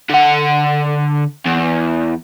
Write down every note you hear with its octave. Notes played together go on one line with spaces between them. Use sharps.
D3 F#5
E2